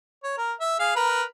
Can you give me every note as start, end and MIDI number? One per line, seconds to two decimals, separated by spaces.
0.24 0.33 73
0.38 0.53 70
0.60 0.75 76
0.80 0.91 68
0.80 0.91 77
0.96 1.23 70
0.96 1.23 71